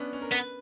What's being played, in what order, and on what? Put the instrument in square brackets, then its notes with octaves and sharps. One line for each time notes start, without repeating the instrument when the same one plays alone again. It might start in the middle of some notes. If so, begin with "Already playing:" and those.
Already playing: [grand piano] B3 C#4 D4
C#4
A#4
[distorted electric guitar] B3 [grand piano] B4